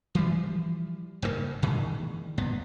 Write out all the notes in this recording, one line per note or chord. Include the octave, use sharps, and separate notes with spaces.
E3 F3 G3
F#1 G2 C#3 A#3
A#2 D#3 E3 G#3
G1 A#2 B3